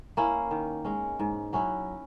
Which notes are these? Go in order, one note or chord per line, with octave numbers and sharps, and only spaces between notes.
A#3 C#4 E4
D#3
G#3 C#4
G#2
F#3 C#4 E4